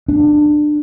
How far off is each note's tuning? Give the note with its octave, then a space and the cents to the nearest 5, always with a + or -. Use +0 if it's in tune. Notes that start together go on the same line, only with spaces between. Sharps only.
D4 +25